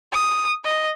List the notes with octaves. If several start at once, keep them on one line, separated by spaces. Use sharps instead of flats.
D#6
D#5